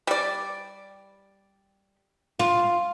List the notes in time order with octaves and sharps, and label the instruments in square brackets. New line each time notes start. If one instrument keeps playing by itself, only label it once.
[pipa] G3 D5
[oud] F4